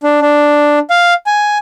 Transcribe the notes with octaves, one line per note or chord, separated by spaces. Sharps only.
D4
D4
F5
G#5